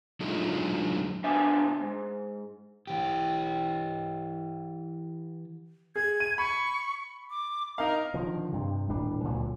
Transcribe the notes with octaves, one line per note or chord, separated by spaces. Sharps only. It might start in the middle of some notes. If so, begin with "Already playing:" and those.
D3 F#3 G#3 A3 D#4 F4
D2 A#2 B3 D4 E5 G#5
G#2
E3 G4
G#4 G#6
D#7
B5 C#6
D6
D#4 A#4 F5
D3 D#3 F3
G2 C3
D#1 A2 G3 D4
C#2 A#2 D3 F#3